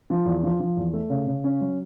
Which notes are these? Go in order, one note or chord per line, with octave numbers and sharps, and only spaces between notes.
F3
E2
F3
F3
E2
A3
C#3
C#3
C#4
F#3